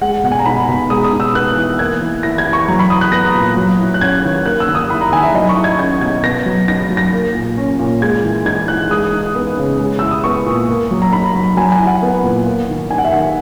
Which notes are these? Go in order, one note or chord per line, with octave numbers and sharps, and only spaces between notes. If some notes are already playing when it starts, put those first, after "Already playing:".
G#3 F#5
B2 F#5
G#5
A#5
D#4 B5
B2
G#3 D#6
D#6
D#4
E6
B3 F#6
E3
A#3 G#6
E3
E4 A#6
G#6
E3
C#6
F#3 A#5
B5
E4 D#6
F#6
B3 A#6
A#2
F#3
E4
F#6
C#4 G#6
D#3
A#3 F#6
E6
D#3
D#6
E4 B5
A#5
D#3 G#5
E5
F#3 D#5
C#6
E4
G#6
C#4 G#6
B2 G#6
B3 A#6
F#3
D#4 A#6
F#3
A#6
A#3
A#2
C#4
A#2
G#3 G#6
E3
D#4 G#6
E3 F#6
G#3 D#6
D#4
B3
C#3
G#3
E4 E6
D#6
B3 C#6
A#2
A#3
F#3
A#5
D#4 B5
F#3
F#3 G#5
G#5
E4
F#5
B3
A#2
A#3
D#3
D#4 G#5
F#5
E5
D#3 F#5